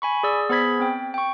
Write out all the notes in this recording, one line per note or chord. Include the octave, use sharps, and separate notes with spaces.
G#5 B5 C#6
G#4 D5 E6
B3 G#4 C5 B5 G#6 B6
C4 G5
G5 C#6